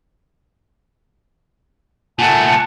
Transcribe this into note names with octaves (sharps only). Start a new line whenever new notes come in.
A#2 A3 F#5 G#5 A5